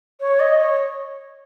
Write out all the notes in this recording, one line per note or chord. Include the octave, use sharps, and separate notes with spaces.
C#5
D#5
C#5